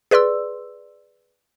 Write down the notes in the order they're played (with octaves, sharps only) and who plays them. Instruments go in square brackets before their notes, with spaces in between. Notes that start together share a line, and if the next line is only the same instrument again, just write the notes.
[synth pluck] G#4 B4 D5 C6 E6